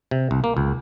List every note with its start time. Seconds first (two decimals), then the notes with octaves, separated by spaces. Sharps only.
0.11 C3
0.31 C2
0.44 A#3
0.57 C#2